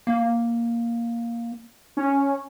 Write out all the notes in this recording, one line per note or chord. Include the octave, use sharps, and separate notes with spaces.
A#3
C#4